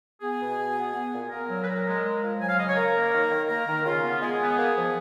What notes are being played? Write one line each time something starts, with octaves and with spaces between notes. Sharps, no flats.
B3 G#4
B2
B2
B3
B3
A#2
A#2 A#4
F#3
B4
A#2 A#4
G#3
G#3
F3
F#3 G#5
F5
C#3 D#5
C#5
C#3 A#4
A#3
D#3
D#3
A#3 A#4
D#3
C#3 F4
B3
G#3 G#4
B3
A#3
F3